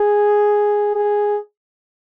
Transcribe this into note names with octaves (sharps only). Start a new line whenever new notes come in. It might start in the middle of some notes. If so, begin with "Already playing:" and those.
Already playing: G#4
G#4